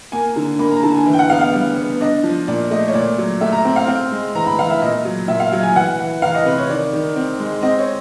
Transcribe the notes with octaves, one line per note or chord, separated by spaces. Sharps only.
A#3 G#5
D3
A#3 B5
A#5
D3 A5
G#5
E3
G5
F#5
B3 F5
F5
G3
B3
D4 D#5
F3
A#2 D5
A3 D#5
C#5
A#2 D5
F#3
A3 E5
A#5
C4
F5
C4
G#3
E3 A#5
B5
E3 F5
E5
A#2 D#5
F#3
A#2 E5
F5
F#3
G#5
E3 F#5
E3
E3 F5
D#5
C3 B4
C#5
D#3 D5
D#3
C4
G#3
C4 D#5
C#5